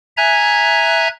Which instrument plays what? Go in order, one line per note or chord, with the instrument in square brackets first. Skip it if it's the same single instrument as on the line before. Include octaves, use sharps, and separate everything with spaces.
[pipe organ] E5 G#5 A#5 F#6 G#6